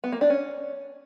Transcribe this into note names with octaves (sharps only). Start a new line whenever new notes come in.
B3
A#3
D4
C#4